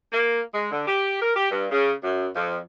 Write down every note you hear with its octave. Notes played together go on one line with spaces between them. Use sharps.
A#3
G#3
D3
G4
A#4
G4
G2
C#3
F#2
F2